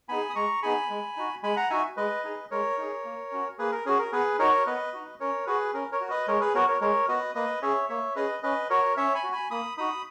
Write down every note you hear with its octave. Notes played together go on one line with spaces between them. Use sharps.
B3 D#4 G#4 G#5 B5
D#6
G#3 A#5 C#6
B3 D#4 G#4 G#5 B5
G#3
D#4 F#4
G#3 G#5 B5
F#5 A#5
D#4 F#4 E5 G#5
G#3 B4 D#5
D#4 G#4
G#3 A#4 C#5
D#4 G#4
A#3
C#4 F#4
A#3 G#4 B4
A#4
C#4 F#4 G#4
A#4
B3 G#4 B4
D#4 F#4 A#4 C#5
B3 B4 D#5
D#4 F#4
C#4 A#4 C#5
F#4 G#4 B4
C#4 A#4
A#4 C#5
F#4
B4 D#5
G#3 A#4 C#5
G#4 B4
B3 F#4 A#4 C#5
A#4 C#5
G#3 A#4 C#5
B3 F#4 B4 D#5
A#3 B4 D#5
C#4 G#4 C#5 E5
A#3 C#5 E5
C#4 G#4 B4 D#5
C#4 B4 D#5
F#4 A#4 C#5
C#4 C#5 E5
G#5 B5
F#4
G#5 B5
A#3 B5 D#6
D#4 F#4 B5 D#6